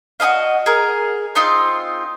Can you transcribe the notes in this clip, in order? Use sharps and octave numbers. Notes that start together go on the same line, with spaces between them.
F#4 G#4 D#5 F5
G#4 A#4
C4 D#4 F4 C6